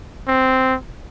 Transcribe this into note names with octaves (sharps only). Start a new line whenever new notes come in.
C4